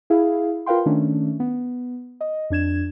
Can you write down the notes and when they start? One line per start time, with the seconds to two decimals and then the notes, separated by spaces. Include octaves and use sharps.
0.10 E4 G#4 F5
0.66 F4 A#4 B4 F5 G5 C6
0.86 D#3 A3 C#4 D4
1.40 B3
2.21 D#5
2.50 F2 D4 G#6 E7